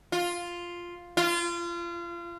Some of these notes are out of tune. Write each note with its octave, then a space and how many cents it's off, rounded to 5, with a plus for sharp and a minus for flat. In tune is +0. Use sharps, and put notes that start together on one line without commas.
F4 +0
F4 -30